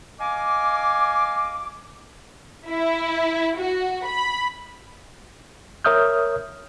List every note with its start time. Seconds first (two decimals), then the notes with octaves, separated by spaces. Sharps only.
0.19 D#5 F5 G#5 D6
2.67 E4
3.57 F#4
4.05 B5
5.85 A#4 C#5 E5 D#6 F6 G6